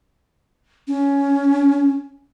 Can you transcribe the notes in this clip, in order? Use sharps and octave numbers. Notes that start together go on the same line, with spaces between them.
C#4